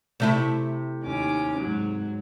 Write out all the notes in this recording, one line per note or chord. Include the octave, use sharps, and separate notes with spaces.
C3 A3 E4
D#2 C#4 D6
G#2 F#3